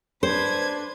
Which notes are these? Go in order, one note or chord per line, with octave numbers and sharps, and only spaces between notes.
D4 B4 C5 G#6